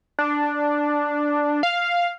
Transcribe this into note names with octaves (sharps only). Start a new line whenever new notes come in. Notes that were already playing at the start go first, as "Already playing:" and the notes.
D4
F5